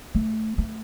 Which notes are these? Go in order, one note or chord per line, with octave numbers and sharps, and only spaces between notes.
A3
A3